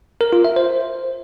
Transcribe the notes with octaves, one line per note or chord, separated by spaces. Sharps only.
A#4
F4
E5
C5